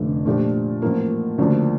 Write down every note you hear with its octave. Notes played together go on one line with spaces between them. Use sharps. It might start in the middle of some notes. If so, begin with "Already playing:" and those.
Already playing: F1 F2 D3 A3
A#2 F3 A3 D4 G4
A1 A2 F3 A#3
D2 C#3 F3 A#3 D4